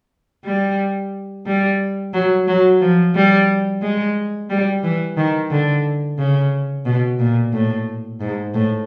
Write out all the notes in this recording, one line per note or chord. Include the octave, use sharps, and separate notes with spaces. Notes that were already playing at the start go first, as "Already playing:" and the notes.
G3
G3
F#3
F#3
F3
G3
G#3
G3
E3
D#3
D3
C#3
B2
A#2
A2
G#2
A2